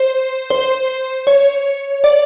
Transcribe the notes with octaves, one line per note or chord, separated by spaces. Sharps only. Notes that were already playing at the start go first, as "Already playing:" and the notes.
Already playing: C5
C5
C#5
D5